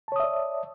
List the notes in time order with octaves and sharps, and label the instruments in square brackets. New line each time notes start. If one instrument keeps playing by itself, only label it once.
[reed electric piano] A5
C#5
D#6
E5
D5